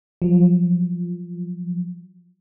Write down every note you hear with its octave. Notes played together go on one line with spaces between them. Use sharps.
F3 F#3